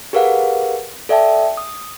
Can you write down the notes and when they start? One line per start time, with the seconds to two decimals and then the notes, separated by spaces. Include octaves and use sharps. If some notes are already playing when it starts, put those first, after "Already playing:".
0.13 G4 G#4 A#4 B4 F5 F#5
1.09 A4 D5 E5 G5 A5
1.57 D#6